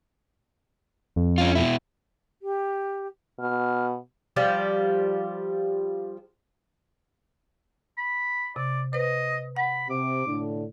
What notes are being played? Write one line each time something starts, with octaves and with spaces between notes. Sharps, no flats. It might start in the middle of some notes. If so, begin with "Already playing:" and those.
F2
C#4 F4
B2 E4
G4
B2 F6
F3 G3 G4
B5
C3 D5
B4 C5 D#5
F#5 B5
C3 D6
A2 D3 D4